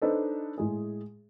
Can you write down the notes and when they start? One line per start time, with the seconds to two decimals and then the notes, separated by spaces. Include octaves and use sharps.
0.02 D4 D#4 A4 B4 C5 D#5
0.58 A2 G#3 G#4